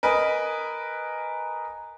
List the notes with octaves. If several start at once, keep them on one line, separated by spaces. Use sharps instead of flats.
A#4 B4 D#5 G#5